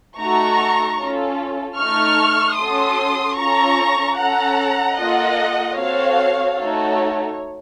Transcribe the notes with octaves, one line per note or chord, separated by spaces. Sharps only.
A3 D#4 F#4 A4 A#5 C#6
C#4 F4 A4
A3 D#4 A4 C#6 F6
C#4 F#4 A4 C6 D#6
C#4 F4 A4 A#5 C#6
C#4 A4 F#5 A#5
A#3 F4 A4 D#5 F#5
C4 F#4 A4 C#5 F5
A3 D#4 F#4 A4 C#5